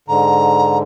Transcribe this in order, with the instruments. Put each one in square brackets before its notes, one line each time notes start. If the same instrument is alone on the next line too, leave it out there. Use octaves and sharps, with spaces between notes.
[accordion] G#2 D3 [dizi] A#5